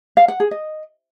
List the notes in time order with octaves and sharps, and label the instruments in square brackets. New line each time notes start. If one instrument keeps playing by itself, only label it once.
[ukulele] F5
F#5
G#4
D#5